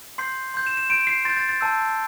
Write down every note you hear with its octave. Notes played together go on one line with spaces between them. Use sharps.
C6 G6 C7
C6 G6
E7
E7
C6 G6 D7
C7
C6 G6 A6
A6
A6
A5 E6 G6